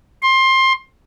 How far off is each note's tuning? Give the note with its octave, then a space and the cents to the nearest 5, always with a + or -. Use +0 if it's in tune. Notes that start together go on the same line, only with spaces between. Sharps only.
C6 +20